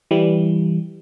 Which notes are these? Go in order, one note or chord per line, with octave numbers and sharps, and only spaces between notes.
E3 G3